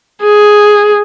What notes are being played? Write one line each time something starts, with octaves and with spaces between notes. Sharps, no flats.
G#4